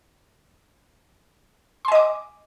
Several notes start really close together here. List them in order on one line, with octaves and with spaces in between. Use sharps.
C6 G#5 D#5 D6